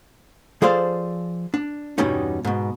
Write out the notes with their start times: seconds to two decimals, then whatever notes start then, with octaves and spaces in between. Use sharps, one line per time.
0.62 F3 G#4 A4 C5 D5 F5
1.54 D4
1.98 E2 G2 B2 G3 C#4 D#4
2.45 G#2 B2